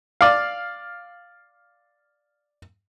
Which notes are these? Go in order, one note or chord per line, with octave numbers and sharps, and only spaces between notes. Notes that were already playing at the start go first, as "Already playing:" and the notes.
D5 F5